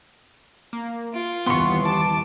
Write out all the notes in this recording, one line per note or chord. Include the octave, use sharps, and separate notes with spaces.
A#3
F4 D7
D#2 E3 G3 B3 C6 C#6
A5 D6